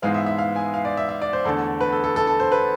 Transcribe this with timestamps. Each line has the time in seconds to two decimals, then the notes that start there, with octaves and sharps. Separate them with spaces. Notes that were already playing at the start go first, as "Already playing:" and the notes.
0.02 G#2 E3 G#3 B3 F5
0.14 E5
0.26 E5
0.38 F5
0.56 G#5
0.74 F5
0.85 D5
0.97 E5
1.09 E5
1.22 D5
1.33 C5
1.45 E2 D3 A3 A4
1.81 B4
1.93 A4
2.04 A4
2.16 A4
2.27 A4
2.40 C5
2.52 B4